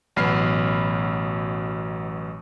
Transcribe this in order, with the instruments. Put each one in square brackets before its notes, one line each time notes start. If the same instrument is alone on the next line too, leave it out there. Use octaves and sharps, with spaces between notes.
[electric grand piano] A1 B2 F#3 B5 F6 C7